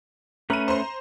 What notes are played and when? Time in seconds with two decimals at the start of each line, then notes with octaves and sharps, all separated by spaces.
0.50 A3 C#4 B4 A#5 D#7
0.68 C5 A#5 C6